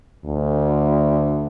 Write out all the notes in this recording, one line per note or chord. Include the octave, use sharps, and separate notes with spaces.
D2